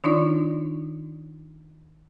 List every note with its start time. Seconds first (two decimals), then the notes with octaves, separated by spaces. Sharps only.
0.04 D#3 D4 D#4 F4 D5